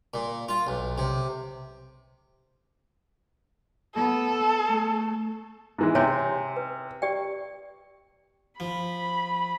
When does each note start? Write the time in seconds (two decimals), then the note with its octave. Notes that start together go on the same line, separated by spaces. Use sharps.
0.14 A#2
0.49 F4
0.67 B1
0.98 C3
3.95 B3 A4
4.68 A3
5.78 G#2 E3 G#3
5.95 C3 C#5 G#5 C6
6.57 B4
7.02 G4 D5 G5
8.60 F3 B5